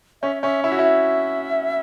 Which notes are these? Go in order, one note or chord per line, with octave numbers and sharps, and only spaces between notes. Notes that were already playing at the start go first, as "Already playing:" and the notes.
C#4 E5
C#4 E5
E4 E5
F#4
E4
E5